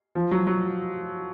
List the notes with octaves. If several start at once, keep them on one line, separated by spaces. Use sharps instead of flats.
F3
F#3
F#3